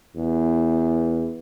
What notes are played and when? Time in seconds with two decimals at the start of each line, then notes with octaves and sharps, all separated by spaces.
0.16 E2